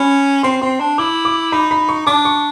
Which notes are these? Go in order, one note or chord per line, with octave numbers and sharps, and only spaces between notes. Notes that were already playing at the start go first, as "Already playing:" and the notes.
Already playing: C#4 B5
C4 C6
C4 C6
D4
E4 D6
D6
D#4 B5
B5
C#6
D4 D6
C#6